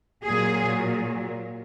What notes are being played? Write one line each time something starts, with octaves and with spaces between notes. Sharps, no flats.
A#2 F#3 G#4